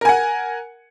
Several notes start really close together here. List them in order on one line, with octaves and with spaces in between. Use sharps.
A#4 G#5 F#5